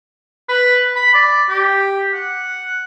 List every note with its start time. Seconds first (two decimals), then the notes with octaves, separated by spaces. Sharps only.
0.49 B4
0.96 B5
1.14 D5
1.49 G4
2.14 F#5